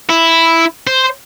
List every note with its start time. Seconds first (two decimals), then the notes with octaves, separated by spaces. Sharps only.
0.09 E4
0.87 C5